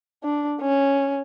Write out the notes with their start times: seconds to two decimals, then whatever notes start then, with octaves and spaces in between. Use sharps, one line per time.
0.23 D4
0.61 C#4